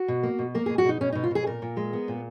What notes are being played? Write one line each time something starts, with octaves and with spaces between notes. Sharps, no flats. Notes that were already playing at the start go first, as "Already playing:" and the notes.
Already playing: F#4
B2
A#3
B2
A#3 A#4
B2 G#4
F#4
B2 D#4
B2 C#4
B2 D#4
F4
B2 G#4
A#2 A#4
A#2
G#3
B3
A#2